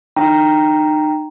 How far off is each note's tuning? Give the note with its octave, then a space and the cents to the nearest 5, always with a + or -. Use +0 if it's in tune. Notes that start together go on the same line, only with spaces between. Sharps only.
D#4 -35 G5 +0 A#5 +0